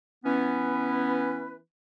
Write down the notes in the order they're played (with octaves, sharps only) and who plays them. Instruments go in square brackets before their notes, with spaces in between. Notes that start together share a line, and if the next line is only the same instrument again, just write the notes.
[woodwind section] E3 B3 C#4 B4